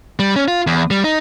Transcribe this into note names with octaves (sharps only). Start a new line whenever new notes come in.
G3
C#4
F4
E2
G3
D#4